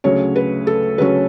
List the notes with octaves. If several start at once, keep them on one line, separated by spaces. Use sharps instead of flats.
D2 C#3 F#3 C#4 C#5
B4
A4
D2 C#3 F#3 C#4 B4